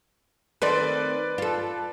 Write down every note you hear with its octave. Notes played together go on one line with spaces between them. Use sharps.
D#3 A3 C4 B4 D5
F4 A4